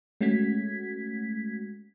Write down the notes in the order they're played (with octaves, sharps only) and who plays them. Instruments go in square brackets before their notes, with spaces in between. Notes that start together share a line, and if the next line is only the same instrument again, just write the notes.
[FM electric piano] G#3 A3 C#4 F#4 G#6 B6